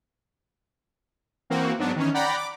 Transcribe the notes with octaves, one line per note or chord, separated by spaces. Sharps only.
E3 A#3 C4 F#4
G#2 F#3 B3 D4
D#3 E3 C#4
D5 F#5 G5 A#5 B5
D6